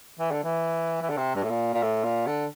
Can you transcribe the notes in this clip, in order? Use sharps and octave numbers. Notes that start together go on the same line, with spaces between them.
E3
D3
E3
E3
D3
C3
G2
A2
A#2
A#2
A2
A#2
D3